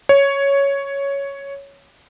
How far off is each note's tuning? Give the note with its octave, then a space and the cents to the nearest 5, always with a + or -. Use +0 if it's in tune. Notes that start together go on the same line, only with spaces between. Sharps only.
C#5 +5